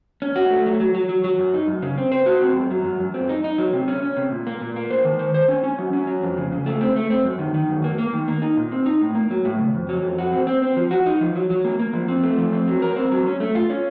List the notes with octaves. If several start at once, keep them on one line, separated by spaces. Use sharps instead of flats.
C#4
F#4
A3
F#3
F#3
F#3
F#3
F#3
F#2
D#4
F#2
C#3
C4
C5
F#4
C4
F#2
F#3
F#2
F#2
C4
D#4
D#4
F#3
C3
C#4
C#4
C3
A#2
A#3
A#2
A#3
C5
D#3
C5
C5
C#4
C#4
F#3
C#4
F#3
F2
C#3
C#3
A3
C4
A3
C4
F#2
D#3
D#3
F#2
A#3
A#3
D#3
A#3
D#4
A#2
C4
D#4
A2
A#3
F#3
A2
C#3
F2
F#3
F2
F#4
C4
C4
C4
F3
F#4
D#4
F3
F#3
F#3
A#3
A#3
F3
C4
A3
F3
C4
F#3
A#4
C4
F#3
C#4
A3
F4
C#4